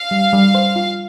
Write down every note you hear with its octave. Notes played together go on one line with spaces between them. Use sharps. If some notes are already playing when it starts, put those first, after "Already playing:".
Already playing: F5
G3
G3
C5
F4